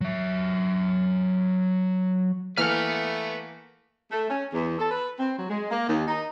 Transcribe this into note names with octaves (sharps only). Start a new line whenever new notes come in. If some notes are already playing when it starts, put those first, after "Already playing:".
F#3 E5
E3 A3 A#3 B4 F#5 F6
A3
C#4
E2
A4
B4
C4
F#3
G#3
A#3
D#2
D#4